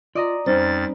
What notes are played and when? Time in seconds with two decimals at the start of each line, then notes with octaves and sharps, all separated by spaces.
0.15 F4 D5 D#5 A#5
0.46 F2 G3 C#4 D#4 C5 A6